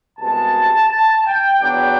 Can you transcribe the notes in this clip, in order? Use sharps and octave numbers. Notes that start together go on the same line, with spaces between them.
C2 B2 G#3 A5
A5
G5
E2 B2 F#3 B3 D4 G5